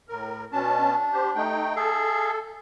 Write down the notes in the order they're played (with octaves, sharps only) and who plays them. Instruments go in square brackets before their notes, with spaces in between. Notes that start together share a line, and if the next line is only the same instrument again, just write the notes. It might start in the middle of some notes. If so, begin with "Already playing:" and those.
[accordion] A2 A#4
[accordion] B2 C#4 A5 [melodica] D4
[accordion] G4 C5
A3 D#4 G5
[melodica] G#4 E5 F5 [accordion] A4